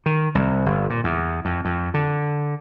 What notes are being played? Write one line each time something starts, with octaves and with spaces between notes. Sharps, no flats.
D#3
C2
G1
A#2
E2
F2
F2
D3